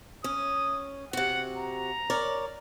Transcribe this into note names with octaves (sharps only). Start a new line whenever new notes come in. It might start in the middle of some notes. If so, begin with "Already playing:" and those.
C#4 D#6
C3 F#4 F#5
A#5
A#4 C#5 D5